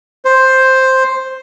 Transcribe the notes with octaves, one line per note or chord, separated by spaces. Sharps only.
C5